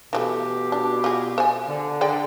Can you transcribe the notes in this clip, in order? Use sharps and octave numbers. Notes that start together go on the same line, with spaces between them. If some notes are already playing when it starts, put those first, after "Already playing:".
B2 E3 F#3 A3 G4
D4
F4 F#4 G#4
C5 D5 G#5
D3
D3 G#4 D5 G5